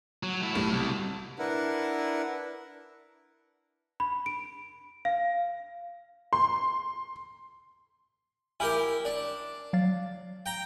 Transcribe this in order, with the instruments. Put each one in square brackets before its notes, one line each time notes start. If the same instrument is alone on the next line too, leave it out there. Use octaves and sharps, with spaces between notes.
[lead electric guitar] F#3
A3 E4
[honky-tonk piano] B1 A2 G3
[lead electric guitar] C2
[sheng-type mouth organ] D4 E4 A#4 B4 F#5
[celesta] B5
D7
F5
[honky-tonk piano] C6
[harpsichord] E4 G4 A#4 [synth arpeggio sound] G#5 F6
[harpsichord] D4
[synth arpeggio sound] F#3 F5 A6
[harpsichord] G5 A#5